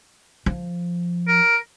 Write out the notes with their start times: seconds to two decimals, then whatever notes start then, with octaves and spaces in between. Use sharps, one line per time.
0.46 F3
1.27 A#4